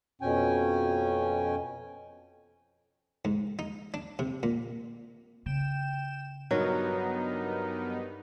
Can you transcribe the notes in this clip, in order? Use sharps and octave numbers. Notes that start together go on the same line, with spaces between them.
F2 B2 C#4 G5 G#5
G#2
D#4
D4
C3
A#2
C#3 G5 E7
G2 F#3 B3 D#4 A#4